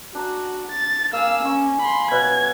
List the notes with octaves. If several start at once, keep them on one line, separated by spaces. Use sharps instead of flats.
D4 F#4 A#5
A6
A#3 F5 G#5 E6
C#4 A#5 C#6
B5 C6
B2 F#3 F#5 G#6